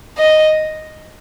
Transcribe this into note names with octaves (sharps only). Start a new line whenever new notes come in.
D#5